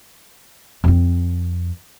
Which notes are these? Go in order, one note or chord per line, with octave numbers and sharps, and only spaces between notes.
F2 C4